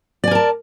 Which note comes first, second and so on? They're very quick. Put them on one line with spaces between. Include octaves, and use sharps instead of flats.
D5 G#5 A#4 A5